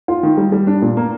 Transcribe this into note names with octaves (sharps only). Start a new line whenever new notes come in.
F4
D#3
G3
G3
D4
A#2
A#3